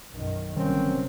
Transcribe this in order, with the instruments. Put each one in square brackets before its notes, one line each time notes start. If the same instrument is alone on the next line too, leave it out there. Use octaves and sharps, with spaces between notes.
[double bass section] B1 F#2 D#3
[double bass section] G1 C3 F#3 [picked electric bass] D#3 G3 [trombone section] A#3 C4 C#4